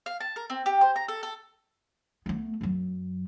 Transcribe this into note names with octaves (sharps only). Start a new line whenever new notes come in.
F5
A5
A#4
C4
G4
C5
A#5
A4
A4
A3 B3
F#2 F#3